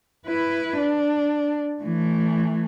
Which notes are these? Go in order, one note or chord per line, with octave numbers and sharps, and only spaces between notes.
E4 B4
D4
E3 A3